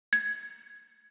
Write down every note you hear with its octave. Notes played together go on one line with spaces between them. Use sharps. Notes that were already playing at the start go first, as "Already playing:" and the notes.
G#6